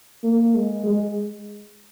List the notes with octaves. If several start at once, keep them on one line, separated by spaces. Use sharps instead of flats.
A#3
G#3
G#3